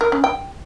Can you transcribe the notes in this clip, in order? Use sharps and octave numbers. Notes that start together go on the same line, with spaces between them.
A#4
C#4
G5